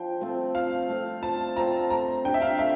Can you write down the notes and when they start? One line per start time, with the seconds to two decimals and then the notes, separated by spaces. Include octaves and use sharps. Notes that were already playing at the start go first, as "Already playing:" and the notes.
Already playing: F3 G5
0.21 A3 C4 F4
0.55 F3 F5
0.89 A3 C4 F4
1.22 F3 A5
1.57 A3 C4 F4 A#5
1.90 A3 A#5
2.24 D4 G5
2.28 G4
2.34 E5
2.42 F5
2.59 A3 E5